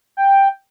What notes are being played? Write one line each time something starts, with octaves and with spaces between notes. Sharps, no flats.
G5